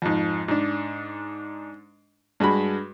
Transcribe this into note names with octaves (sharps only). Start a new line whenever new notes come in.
F2 G#2
G#2 D4
G2 G#3 F#4 B5